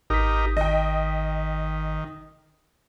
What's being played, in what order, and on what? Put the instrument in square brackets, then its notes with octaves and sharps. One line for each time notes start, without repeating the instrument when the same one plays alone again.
[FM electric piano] G#1 B6 [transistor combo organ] D#4 G4 A#4
[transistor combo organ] D#3 [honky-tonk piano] D#5 G5